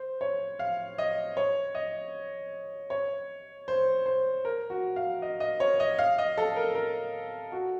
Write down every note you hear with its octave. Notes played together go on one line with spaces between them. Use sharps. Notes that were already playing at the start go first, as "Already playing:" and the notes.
Already playing: C5
C#5
F5
D#5
C#5
D#5
C#5
C5
C5
A#4
F#4
F5
D#5
D#5
C#5
D#5
F5
D#5
A4
A#4
A#4
F#4